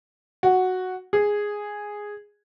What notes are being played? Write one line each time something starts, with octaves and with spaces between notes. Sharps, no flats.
F#4
G#4